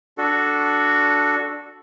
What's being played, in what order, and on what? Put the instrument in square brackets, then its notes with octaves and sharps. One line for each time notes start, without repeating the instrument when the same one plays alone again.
[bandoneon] D4 F#4 A4